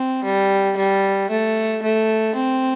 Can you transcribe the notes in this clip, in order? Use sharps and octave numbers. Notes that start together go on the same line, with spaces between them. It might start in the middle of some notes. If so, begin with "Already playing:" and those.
Already playing: C4
G3
G3
A3
A3
C4